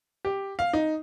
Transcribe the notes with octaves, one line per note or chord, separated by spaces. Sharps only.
G4
F5
D#4